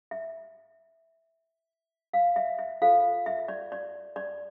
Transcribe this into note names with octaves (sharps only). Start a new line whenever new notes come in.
E5
F5
E5
E5
F4 A4 C5 F5
E5
D5
D5
D5